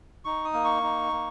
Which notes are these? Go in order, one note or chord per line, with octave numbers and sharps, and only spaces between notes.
D#4 C#6
D#6
A#3
C#6
D#4
A#3